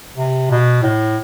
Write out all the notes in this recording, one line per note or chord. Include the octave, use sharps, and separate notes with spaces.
C3
B2
A2